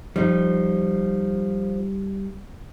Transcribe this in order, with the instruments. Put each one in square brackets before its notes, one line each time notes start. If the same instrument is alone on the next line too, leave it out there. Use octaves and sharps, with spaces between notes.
[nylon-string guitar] F3 [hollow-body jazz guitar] G3 D#4